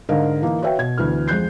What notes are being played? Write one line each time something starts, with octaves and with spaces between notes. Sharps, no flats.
G#2 D3 A#4 D#5 F5
E3 A#3 D#4
F#4 B4 C#5 E5 F5 G5
B2 G#6
D2 E3 B3 F6
F2 G#3 F#6 G6 C7